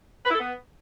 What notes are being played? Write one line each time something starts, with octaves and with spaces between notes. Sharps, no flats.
B4
E4
A4
B3